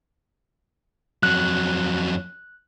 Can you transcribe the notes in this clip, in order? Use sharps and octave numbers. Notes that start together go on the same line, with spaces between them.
F2 F#3 F#6